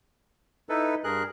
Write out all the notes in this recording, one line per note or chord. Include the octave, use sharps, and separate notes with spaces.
D#4 E4 A4 B4
G2 G#4 A#4 F#6